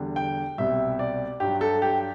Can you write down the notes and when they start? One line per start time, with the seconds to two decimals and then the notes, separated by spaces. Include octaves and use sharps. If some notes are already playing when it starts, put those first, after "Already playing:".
Already playing: E2 D3 G3
0.16 G5
0.58 C2 B2 G3 E5
0.99 D5
1.40 G2 F#3 G4
1.61 A4
1.82 G4